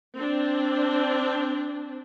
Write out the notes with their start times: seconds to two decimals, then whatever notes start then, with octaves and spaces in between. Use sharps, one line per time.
0.16 C4 D4